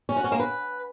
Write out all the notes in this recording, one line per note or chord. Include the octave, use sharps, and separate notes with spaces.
C#4
F#4
C#4
A#3
B4